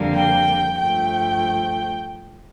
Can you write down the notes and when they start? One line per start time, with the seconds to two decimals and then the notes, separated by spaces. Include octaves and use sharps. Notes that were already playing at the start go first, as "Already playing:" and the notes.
Already playing: F2 D3 G3 A#3
0.15 G5
0.78 G2 F3 A3 G5